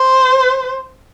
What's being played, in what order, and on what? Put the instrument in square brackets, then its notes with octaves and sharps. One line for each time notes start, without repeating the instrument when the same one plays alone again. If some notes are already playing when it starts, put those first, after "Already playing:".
Already playing: [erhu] C5